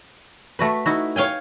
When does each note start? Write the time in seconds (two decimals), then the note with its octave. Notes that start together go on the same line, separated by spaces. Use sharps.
0.59 A3 F#4 B4
0.86 D#4 E4 F#4
1.16 C#5 F5 G5 G#5